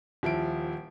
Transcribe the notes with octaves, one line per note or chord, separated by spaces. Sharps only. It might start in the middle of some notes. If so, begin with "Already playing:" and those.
D#1 F3 E4 D7